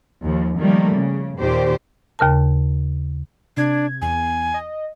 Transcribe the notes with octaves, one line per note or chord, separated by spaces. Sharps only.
D#2 F3
D#3 F3 G3 A3 A#3
C#3
D#2 A#2 D#3 G4 C5
D#2 C#3 A#4 A5
C3 D4 G#6
E2 G#5
D#5